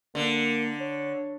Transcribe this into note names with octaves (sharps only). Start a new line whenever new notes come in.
D3 A#3
C#5